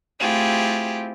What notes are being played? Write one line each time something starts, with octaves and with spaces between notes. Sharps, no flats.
A3 C4 E4 F4 G4 G#4